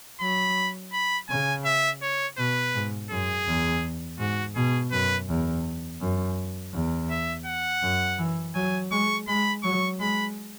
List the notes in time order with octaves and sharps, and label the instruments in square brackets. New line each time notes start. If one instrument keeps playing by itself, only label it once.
[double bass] F#3 [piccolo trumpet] B5
[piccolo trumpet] B5
[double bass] C#3 [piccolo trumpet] G#5
[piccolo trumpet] E5
C#5
[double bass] B2 [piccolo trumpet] B4
[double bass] G#2
[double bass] F#2 [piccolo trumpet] G#4
[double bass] E2
[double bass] G#2 [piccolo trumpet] F#4
[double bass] B2 [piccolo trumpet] G#4
[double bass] F#2 [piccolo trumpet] B4
[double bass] E2
F#2
E2
[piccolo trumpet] E5
F#5
[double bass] F#2
E3
[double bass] F#3 [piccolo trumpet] G#5
[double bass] G#3 [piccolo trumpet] C#6
[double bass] G#3 [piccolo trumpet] B5
[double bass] F#3 [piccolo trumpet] C#6
[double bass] G#3 [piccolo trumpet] B5